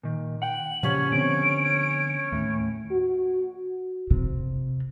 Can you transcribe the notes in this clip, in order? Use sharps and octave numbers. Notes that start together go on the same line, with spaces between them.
A#2 D#3
F#5 G5 F#7
A#2 C#3 F3 C#4 G4 C#5
D3 B3 C4 D7
D#2 A2
F#4
C3